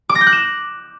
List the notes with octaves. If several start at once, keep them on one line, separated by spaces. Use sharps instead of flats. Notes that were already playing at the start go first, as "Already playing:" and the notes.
D6
A#6
G6
F#6
E7